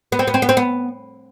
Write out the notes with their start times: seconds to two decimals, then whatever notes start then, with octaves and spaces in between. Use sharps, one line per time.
0.12 B3
0.19 C4
0.28 B3
0.34 C4
0.42 B3
0.49 C4
0.57 B3